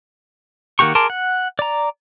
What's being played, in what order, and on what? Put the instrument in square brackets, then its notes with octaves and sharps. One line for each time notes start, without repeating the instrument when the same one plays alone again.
[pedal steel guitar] D#3 A#3 F#4 G4 C#6
G#4 A#4 A5 C6 D6
F#5
D5 A#5